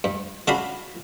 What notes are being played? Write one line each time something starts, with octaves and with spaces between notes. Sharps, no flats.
G2
C#3 D4 F#4 F5 B5 C6